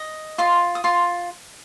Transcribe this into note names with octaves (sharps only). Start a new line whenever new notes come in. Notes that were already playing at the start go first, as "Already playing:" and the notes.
Already playing: D#5
F4 C6
D#6
F4 C6